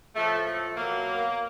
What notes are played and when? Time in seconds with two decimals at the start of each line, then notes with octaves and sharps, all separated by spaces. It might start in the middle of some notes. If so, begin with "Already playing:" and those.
0.16 A2 F3 A3
0.47 A3
0.77 B2 F#3 A#3